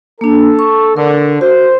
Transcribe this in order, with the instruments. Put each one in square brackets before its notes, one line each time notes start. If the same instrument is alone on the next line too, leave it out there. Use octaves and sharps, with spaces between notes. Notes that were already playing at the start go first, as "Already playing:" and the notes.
[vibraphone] A#3 D4 [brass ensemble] A4
[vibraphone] C#6
[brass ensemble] D3 [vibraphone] A#4
[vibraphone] F#4 [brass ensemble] C5